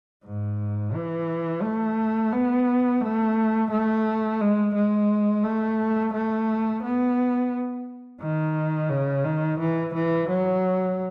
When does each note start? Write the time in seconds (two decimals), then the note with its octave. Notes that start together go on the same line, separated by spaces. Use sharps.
0.25 G#2
0.95 E3
1.63 A3
2.32 B3
3.01 A3
3.70 A3
4.41 G#3
4.75 G#3
5.44 A3
6.13 A3
6.83 B3
8.21 D#3
8.90 C#3
9.25 D#3
9.59 E3
9.94 E3
10.29 F#3